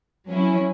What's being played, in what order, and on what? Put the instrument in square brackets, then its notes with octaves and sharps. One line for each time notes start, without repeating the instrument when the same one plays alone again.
[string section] F#3 C#4 E4